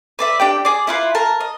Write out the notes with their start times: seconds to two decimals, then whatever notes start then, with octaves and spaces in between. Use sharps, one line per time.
0.19 B4 D5 E5
0.40 D4 G4 G5
0.65 G#4 D5
0.87 E4 F4 B4
1.15 A#4 A5
1.40 D#5